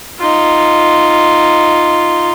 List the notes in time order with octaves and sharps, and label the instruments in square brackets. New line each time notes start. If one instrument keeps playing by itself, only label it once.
[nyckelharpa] D#4 F4